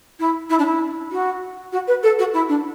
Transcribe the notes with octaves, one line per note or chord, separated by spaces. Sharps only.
E4
E4
D4
E4
F#4
F#4
B4
A4
F#4
E4
D4